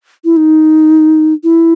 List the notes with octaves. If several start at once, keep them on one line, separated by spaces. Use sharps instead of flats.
E4
D#4
E4